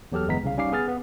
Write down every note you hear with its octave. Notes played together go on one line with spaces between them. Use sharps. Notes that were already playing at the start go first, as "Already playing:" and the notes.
E2 F#3 G4 A4 F6
G1 E3 G#3 B3 A#5 B6
C2 C#3 F5
G3 C#4 D#4 F5 D6 C7
B3 G#4 F6 A6
B3